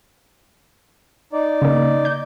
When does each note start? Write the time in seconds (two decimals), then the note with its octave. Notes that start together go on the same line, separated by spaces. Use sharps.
1.33 D#4 D5
1.62 C#3 A#3
2.05 G6